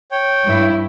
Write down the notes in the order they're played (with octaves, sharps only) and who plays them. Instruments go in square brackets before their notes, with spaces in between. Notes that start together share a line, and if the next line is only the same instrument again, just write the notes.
[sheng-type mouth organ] C#5 G5
[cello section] G2 E4